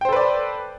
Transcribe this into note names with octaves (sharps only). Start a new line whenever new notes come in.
A4 B4 C5 D5 G5